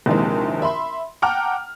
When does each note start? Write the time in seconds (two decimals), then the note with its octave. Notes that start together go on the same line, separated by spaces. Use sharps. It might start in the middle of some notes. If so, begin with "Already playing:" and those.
0.06 A#1 D#2 C3 E3 G#3
0.62 E5 B5 C6
1.22 F#5 G5 A5 A#5 D6 F6